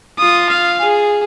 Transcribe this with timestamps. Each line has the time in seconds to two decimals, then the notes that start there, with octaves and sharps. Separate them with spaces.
0.19 F4 D#6
0.50 F5
0.80 G#4